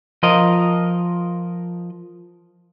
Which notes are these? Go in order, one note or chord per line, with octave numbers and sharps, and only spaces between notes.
F3 F4 A#4 D#5